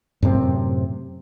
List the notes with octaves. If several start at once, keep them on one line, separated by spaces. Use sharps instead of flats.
F#2 A2 C3 C4